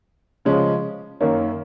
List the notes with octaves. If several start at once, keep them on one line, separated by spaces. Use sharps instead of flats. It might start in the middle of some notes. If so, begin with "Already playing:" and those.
C#3 F3 G#3 C#4
F#2 D#3 A#3 C#4